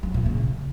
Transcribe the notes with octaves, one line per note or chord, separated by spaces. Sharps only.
F#3
A#2
C#3